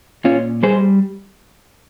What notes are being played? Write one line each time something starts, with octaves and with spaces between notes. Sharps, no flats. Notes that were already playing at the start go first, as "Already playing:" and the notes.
A#2 C#4 F4
G3 G#4 C5